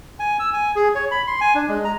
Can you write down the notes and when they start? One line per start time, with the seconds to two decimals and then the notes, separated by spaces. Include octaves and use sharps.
0.19 G#5
0.39 E6
0.53 G#5
0.76 G#4
0.95 C#5
1.11 B5
1.27 C6
1.41 G#5
1.55 D4
1.68 G#3
1.84 A#5